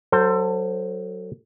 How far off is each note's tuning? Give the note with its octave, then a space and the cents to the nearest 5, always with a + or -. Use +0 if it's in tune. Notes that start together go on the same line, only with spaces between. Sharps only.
F#3 +5 A4 +30 C5 +0